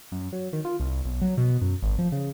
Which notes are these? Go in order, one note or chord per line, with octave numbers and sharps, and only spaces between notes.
F#2
F#3
D#3
F4
C2
B1
F#3
B2
F#2
G#1
F3
C#3